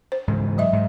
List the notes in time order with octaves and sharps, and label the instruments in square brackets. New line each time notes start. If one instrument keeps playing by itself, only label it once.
[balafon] C5
[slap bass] G#2 C#3 E3
[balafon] F#3 D#5 E5
[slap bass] G#2